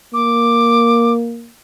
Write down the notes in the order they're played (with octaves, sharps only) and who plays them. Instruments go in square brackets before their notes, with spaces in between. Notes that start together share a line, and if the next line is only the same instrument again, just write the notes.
[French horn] A#3 [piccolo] D6